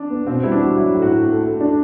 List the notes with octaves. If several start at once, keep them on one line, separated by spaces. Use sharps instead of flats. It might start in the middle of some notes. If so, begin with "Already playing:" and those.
Already playing: D4
B3
B2 C4
G3 E4
D4
F#4
F#3 E4
A2
F#4
A2
A3
A3
D4